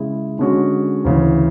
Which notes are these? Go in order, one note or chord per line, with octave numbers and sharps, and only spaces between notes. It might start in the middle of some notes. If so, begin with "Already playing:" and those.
Already playing: C#3 G#3 C#4 E4
D3 G#3 C#4 F#4
D2 C#3 E3